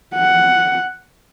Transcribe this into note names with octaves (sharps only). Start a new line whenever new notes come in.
F#5